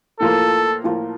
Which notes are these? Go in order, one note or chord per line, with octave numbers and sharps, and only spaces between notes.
A2 F3 A#3 F4 A4
A2 F3 A#3 F4